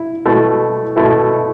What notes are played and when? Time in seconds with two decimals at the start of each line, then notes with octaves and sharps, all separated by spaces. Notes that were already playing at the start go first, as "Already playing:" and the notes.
Already playing: E4
0.26 B2 A3 E4 A4
0.96 B2 A3 E4 A4